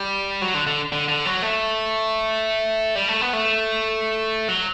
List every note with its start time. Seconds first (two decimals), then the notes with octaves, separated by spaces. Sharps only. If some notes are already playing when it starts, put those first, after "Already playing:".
Already playing: G3
0.41 F#3
0.54 D3
0.67 D3
0.93 D3
1.09 D3
1.26 F#3
1.42 A3
2.95 G3
3.08 A3
3.21 B3
3.33 A3
4.48 F#3